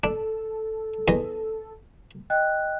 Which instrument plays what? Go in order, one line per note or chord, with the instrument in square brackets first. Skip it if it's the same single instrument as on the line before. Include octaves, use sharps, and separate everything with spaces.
[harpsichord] D4 [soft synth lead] A4
[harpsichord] E2 D#5
[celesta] D#5 G5 F#6